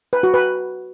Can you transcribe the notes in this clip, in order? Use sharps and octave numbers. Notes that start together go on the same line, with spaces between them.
B4
F#4
B4